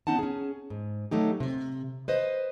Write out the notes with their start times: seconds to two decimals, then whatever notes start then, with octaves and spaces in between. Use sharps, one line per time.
0.07 B3 C#4 D#4 F#5 A5
0.19 C#4 G#4
0.70 G#2
1.11 F#3 A3 D#4 G4
1.40 C3
2.08 B4 C5 D#5